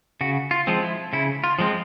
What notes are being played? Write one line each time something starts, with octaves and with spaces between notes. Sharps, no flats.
C#3 F#4
F4
F3 G#3 C4
E4
C#3 E4
F4
F3 G#3 C4